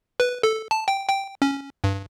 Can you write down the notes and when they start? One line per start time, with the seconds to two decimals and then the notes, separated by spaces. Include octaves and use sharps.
0.20 B4
0.43 A4
0.71 A5
0.88 G5
1.09 G5
1.42 C#4
1.84 G2